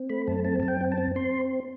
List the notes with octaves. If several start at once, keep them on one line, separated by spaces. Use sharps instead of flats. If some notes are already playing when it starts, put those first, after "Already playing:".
Already playing: C4
A3 B5
F#2 A5
C4 A5
F#2 A5
G5
C4
A5
C4
C4 C6